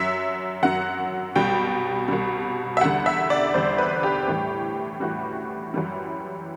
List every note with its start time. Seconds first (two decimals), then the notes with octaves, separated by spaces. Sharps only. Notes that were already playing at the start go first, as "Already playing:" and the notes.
Already playing: F#2 F#3 E5
0.63 F#2 F#3 F#5
1.36 C2 B2 G3 G5
2.08 C2 B2 G3
2.77 E5
2.81 E2 D3 G3 F#5
3.06 E5
3.30 D5
3.54 E2 D3 G3 C5
3.78 B4
4.03 G4
4.28 A2 E3 G3
5.00 A2 E3 G3 F#4
5.74 F#2 E3 G3